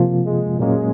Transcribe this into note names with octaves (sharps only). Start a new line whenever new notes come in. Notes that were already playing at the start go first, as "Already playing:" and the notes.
Already playing: C3 F3 A#3 F4
G#3
A#2 F#3 G#3 A#3 C#4